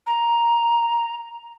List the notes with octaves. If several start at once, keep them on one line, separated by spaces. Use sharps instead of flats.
A#5